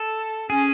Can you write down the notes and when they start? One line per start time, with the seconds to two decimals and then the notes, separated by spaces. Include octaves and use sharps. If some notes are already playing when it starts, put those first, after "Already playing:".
Already playing: A4
0.50 C#4 G#4